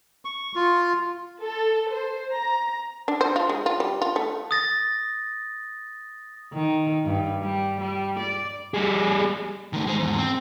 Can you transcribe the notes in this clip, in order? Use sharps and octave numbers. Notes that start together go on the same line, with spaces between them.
C#6
F4
A4
C5
A#5
D4
C5
F4
G#3
F4
G3
F4
A3
D#6 A6 A#6
D#3
G2
G3
G3
D5
G3 G#4
D#3 A3
G#3 C5
E2 G#2
C4